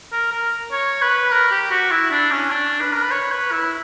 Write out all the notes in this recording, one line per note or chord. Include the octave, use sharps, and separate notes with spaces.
A#4
A#4
C#5
B4
A#4
G4
F#4
E4
D4
C#4
D4
B4
A#4
B4
C#5
B4
E4